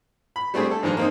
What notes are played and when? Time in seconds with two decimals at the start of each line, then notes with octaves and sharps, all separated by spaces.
0.36 B5
0.54 G3 A3 C4 D4 G#4
0.71 A4
0.83 G#2 E3 F3 D4
0.97 A#3 C4 D#4